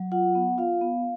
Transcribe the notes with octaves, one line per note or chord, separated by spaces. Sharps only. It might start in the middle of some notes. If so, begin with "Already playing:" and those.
Already playing: F#3
F4 F#5
B3
F4 F5
B3